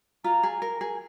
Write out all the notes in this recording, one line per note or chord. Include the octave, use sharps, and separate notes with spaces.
F4 A#5
G#4
A#4
G#4